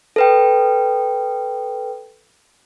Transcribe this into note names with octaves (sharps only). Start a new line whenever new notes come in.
A4 B4 G5